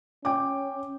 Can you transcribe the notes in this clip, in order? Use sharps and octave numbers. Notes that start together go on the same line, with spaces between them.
C#4 G5 D6